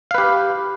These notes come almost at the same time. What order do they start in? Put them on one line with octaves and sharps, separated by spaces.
F5 B4 G4